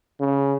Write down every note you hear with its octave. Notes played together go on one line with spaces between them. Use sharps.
C#3